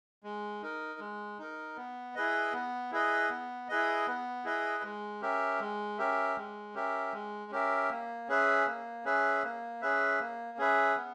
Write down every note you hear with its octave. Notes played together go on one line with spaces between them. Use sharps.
G#3
D#4 A#4
G#3
D#4 A#4
B3
E4 G#4 B4 D#5
B3
E4 G#4 B4 D#5
B3
E4 G#4 B4 D#5
B3
E4 G#4 B4 D#5
G#3
C#4 G4 A#4 E5
G#3
C#4 G4 A#4 E5
G#3
C#4 G4 A#4 E5
G#3
C#4 G4 A#4 E5
A#3
C#4 G#4 B4 E5
A#3
C#4 G#4 B4 E5
A#3
C#4 G#4 B4 E5
A#3
C#4 G#4 B4 E5
B3